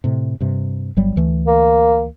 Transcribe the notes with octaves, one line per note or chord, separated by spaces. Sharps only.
A2 C3
G2 C3
G1 F#3 G3
D2 E3 A3
A#3